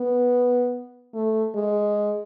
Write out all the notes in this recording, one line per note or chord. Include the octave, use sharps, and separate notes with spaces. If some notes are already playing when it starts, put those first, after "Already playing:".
Already playing: B3
A3
G#3